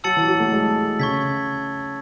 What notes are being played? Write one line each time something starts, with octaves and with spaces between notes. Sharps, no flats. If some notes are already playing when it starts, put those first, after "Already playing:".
F#3 A5 E6 A6 C#7 F#7
E3
F#3
A3
G#3
C#3 C#6 G#6 B6